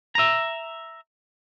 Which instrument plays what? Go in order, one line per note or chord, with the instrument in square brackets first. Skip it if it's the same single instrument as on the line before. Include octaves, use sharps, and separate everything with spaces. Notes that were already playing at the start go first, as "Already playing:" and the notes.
[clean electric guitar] E5 A#5